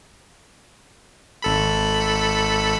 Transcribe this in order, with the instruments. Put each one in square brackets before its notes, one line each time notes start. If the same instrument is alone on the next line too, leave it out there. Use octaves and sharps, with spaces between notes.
[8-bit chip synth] G#1 A4 B5